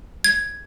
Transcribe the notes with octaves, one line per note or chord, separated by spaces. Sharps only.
G#6